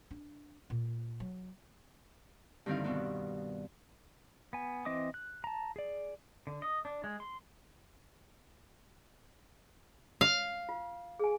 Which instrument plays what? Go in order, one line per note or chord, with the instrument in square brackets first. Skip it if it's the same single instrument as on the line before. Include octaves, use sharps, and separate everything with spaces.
[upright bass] D4
A#2
F#3
[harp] G2 D3 D#3 C4 E4 F5
B2 D#3 B3 C4
[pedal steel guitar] B3 G#5
E3 C4 D#5 D6 D#6
F#6
A5 A#5
G#4 D5
D3
D#5
D4
G#3
C6
[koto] F5
[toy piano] F4
G#4 G#5